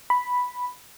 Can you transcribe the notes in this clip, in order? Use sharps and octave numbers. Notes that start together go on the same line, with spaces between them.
B5